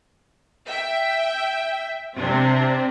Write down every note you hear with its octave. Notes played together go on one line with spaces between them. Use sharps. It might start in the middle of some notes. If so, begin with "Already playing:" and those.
E5 G5
C3 C4 D4